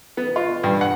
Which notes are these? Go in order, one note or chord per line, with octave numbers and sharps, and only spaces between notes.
B3
F4
G2
F#5